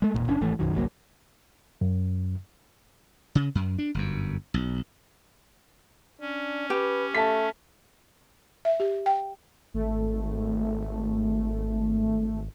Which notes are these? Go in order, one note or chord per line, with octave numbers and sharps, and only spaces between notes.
G#3 A3
E1 F2 A#2
F#1 C#4 D4
G#1 E3 A3
B1 F#2 D#3 F#3
G1 C2 F#3 A#3
F#2
C#3
F#2
D4
G1 F#2
B1
C#4 D4
G4 B4
A3 A5 B6
E5
G4
G5
G#1 A3